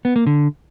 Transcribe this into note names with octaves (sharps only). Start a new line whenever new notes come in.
B3
A#3
D3